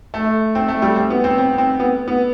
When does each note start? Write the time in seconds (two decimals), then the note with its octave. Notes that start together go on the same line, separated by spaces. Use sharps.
0.14 A3
0.55 C4
0.68 A3
0.82 G3
0.96 C4
1.10 B3
1.24 C4
1.38 C4
1.58 C4
1.80 B3
2.08 B3